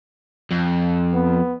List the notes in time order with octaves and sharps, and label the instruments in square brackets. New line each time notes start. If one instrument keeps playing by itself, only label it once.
[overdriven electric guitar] F2
[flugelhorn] B3